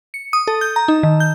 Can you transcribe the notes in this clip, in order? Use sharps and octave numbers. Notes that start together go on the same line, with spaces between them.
C#7
D#6
A4
G6
A#5
D#4
D#3
G6